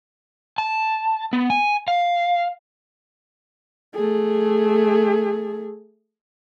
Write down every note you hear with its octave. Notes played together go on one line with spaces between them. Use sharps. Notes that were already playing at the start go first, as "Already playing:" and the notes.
A5
B3
G#5
F5
A3 G#4